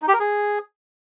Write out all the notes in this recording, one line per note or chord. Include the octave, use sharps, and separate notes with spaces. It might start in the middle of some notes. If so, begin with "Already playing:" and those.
D#4
G4
A#4
G#4